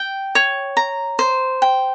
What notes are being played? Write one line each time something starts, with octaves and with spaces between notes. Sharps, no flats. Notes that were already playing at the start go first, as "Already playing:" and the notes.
Already playing: G5
C#5
A#5
C5
G5